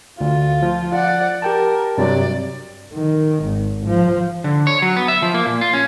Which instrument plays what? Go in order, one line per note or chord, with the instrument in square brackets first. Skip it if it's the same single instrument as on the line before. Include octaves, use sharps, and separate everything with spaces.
[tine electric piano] D2 [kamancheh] F4
[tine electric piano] F3
[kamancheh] D5 F#5
[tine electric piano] G4 G5 A5 [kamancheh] A#4
[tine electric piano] G2 C3 F#3 [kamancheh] D5
[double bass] D#3
G#1
F3
[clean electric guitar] D3
C#5
F#3
B3
E5
F3
A#3
A#2
F4
C#4